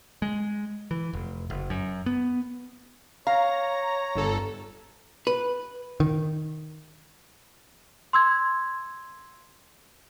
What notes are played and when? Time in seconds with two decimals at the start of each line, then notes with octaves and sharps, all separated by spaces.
0.22 G#3
0.91 E3
1.13 F1
1.50 F#1
1.70 F#2
2.06 B3
3.27 C#5 F5 A#5
4.15 G1 A4
5.27 B4
6.00 D#3
8.13 C6 E6 G#6